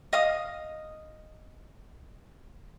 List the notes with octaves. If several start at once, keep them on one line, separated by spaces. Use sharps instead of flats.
D#5 F5 D#6